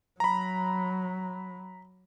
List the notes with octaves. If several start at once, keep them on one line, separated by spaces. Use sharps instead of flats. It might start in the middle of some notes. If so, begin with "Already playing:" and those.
F#3 A#5 B5